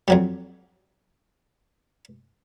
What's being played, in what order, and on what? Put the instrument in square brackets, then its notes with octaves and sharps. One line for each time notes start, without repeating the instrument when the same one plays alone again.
[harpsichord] F2 F#3 G3